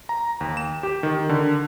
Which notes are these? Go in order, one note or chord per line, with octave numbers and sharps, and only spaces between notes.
A#5
D#2
E7
G4
D#3
D3